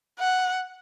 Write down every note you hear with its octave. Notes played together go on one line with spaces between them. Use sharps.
F#5